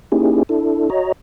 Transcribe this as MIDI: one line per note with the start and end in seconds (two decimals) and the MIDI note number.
0.12 0.43 58
0.12 0.43 61
0.12 0.43 63
0.12 0.43 64
0.12 0.43 67
0.12 0.43 68
0.49 0.90 62
0.49 0.90 64
0.49 0.90 69
0.90 1.12 66
0.90 1.12 73
0.90 1.12 75
0.90 1.12 82